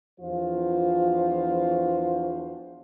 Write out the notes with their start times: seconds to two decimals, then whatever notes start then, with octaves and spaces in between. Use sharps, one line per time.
0.20 E2 F3 D4 F4 F#4 C5